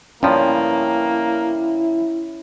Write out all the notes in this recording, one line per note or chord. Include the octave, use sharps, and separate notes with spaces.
G2 F3 A#3 B3 C#4 E4